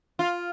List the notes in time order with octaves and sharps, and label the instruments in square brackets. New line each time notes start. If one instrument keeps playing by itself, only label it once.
[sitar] F4